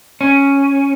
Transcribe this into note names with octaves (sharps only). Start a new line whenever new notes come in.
C#4